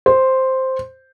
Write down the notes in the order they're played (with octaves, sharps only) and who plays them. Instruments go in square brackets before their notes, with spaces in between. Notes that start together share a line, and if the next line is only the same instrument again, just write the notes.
[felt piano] C5